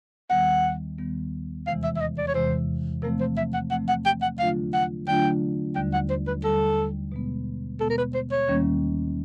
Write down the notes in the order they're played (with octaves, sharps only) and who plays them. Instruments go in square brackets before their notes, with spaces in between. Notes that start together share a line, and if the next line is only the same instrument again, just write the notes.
[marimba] D#2 D#3 G3 B3 [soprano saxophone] F#5
[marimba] D#2 D#3 G3 B3
[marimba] E2 C3 E3 G#3 [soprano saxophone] F5
[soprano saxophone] E5
E5
D#5
D5
C#5
[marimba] E2 C3 E3 G#3 [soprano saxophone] C5
[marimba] C3 F3 A3 C4 [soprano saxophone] A#4
[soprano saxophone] C5
E5
F#5
[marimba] C3 F3 A3 C4 [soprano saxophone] F#5
[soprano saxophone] F#5
G5
F#5
[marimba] D3 F#3 A3 D4 F4 [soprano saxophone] F5
[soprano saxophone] F#5
[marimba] D3 F#3 A3 D4 F4 [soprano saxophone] G5
[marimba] D#2 D3 G3 [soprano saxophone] G5
[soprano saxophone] F#5
C5
B4
[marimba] D#2 D3 G3 [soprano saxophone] A4
[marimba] B2 G#3 B3
[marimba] B2 G#3 B3 [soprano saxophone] A4
[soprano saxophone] A#4
B4
C5
C#5
[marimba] D#2 D#3 G3 A#3 C#4